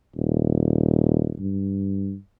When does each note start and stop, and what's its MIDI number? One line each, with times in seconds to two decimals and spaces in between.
0.16 1.35 27
1.41 2.15 43